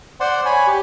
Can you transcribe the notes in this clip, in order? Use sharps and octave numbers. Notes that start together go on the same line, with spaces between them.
C5 D5 F#5 C6
C#5 G#5 B5
G4